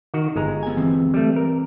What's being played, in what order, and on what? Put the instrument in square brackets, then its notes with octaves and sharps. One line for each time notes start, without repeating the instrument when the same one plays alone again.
[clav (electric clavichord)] D#3 F#4
G1 G#3 A#5
[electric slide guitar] B3 G#5
E3 C4
[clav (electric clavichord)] G3 A3
A#4